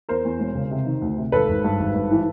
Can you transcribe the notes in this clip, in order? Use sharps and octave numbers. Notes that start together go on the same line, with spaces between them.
E2 A#4 C5
E2
E1
C#3
C3
D#3
D2
C3
G#1 A4 B4
G#1
G2
G#1
G2
E3